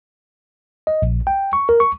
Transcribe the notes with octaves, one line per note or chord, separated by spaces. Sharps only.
D#5
A#1
G5
C#6
A#4
C#6